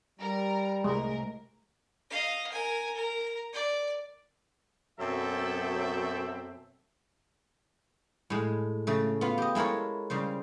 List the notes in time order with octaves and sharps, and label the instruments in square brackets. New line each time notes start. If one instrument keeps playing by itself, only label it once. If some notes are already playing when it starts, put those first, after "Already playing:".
[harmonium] G3 [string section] A#4 A#5
[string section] C2 A2 A#4 [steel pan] G#3
[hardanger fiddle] D#5 F5
A#4 G#5
A#4
D5
[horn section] F#2 B2 F#3 C4 A4 E5
[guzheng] A2 G#3
C#3 A3
B3 F4
G4 D#5
G#3 E4 A4 A#4 C#5
C#3 G3 C5